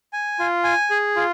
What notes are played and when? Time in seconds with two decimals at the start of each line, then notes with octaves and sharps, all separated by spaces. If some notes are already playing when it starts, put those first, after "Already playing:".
0.13 G#5
0.40 F4
0.64 G#5
0.90 G#4
1.16 F4